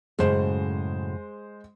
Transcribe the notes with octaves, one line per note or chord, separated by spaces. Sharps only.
F#2 A2 C#3 G#3 C5